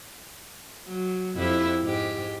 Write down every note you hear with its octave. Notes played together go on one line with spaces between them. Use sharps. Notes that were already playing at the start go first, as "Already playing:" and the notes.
F#3
F2 E4 G4
G#2 G4